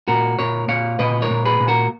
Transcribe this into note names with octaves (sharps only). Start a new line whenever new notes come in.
A#2 F#4 A#4
A#2 A#4 C#5
A#2 C#5 F5
A#2 B4 D#5
A#4 C#5
A#2
G#4 B4
A#2
F#4 A#4